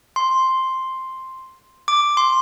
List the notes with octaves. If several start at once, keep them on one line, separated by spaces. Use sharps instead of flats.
C6
D6
C6